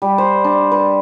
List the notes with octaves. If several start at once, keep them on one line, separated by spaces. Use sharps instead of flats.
G3
C5
D4
B4